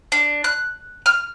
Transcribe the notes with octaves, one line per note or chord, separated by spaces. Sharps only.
D4
F#6
F6